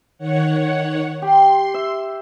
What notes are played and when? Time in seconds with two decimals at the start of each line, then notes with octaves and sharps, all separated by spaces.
0.18 D#3 C#5 F#5
1.22 G4 C6
1.74 E5